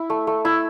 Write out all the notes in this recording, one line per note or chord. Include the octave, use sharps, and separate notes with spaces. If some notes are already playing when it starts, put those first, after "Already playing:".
Already playing: E4
A3
A3
E4